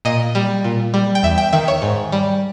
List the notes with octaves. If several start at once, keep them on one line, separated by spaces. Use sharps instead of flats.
A#2 D#5
G3
A#2
G3
G5
E2 E5
G5
D#3 E5
C#5
G#2
G3